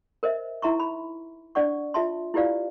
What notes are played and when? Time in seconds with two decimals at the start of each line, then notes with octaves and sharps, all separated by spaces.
0.23 A#4 C5 D#5 E5
0.62 D#4 E4 E5 A#5 C6 C#6
0.80 B5
1.55 D4 D5 F#5 C#6
1.94 F4 E5 A5 C6
2.34 E4 F4 G4 B4 D5 F5